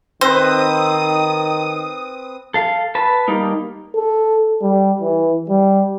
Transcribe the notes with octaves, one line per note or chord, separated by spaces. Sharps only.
D#3 C4 B4 C5 D#6
A4 F5
B4 A5
G3 A#3 D#4
A4
G3
E3
G3